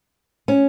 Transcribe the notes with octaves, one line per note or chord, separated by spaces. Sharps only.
C#4